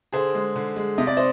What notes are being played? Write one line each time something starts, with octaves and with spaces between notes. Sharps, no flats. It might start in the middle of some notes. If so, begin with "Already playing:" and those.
D3 G#4 C5
G#3
D3
G#3
C3 D#5
D5
C5 D#5